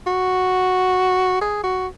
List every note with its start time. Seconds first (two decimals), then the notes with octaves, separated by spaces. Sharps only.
0.07 F#4
1.41 G#4
1.64 F#4